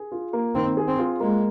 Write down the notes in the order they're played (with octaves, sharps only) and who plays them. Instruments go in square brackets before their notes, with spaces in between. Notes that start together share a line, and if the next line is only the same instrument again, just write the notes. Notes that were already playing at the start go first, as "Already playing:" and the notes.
Already playing: [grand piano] G#4
F4
A#3
[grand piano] D#3 [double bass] C4
[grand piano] G#4
[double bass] C4
[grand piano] F4
[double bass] G#3 [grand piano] A#3